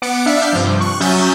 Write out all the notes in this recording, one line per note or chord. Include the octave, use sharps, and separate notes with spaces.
B3 D6 F#6 C#7
D4 E5 F5
D6 F6 G6 C7
G2 C3 F3
C#6 F#6
F#3 C#4 E5 D#6 G6 A6